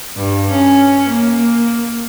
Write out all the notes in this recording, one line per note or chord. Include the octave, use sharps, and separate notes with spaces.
G2
C#4
A#3